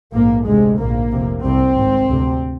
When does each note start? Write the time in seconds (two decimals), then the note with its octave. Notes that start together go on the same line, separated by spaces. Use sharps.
0.13 A#1 G#2 A#3
0.46 D2 C3 G#3
0.78 A#1 G#2 A#3
1.11 F1 F2 C3
1.43 C2 C3 C4
1.77 G#1 G#2
2.09 D2 C3